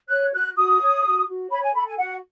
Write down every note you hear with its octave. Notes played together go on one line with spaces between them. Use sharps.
C#5 F#6
F#4 F#6
F#4 D#6
C#5
F#4
F#4
C#5 B5
G#5
A4 B5
G#5
F#4 F#5